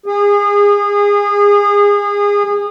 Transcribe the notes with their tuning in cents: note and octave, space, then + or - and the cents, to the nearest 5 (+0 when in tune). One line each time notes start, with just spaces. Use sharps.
G#4 -30